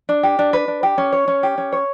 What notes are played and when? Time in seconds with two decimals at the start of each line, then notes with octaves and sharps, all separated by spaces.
0.09 D4
0.23 G4
0.39 D4
0.53 B4
0.68 D4
0.83 G4
0.98 C#4
1.12 C#5
1.28 C#4
1.43 G4
1.58 C#4
1.73 C#5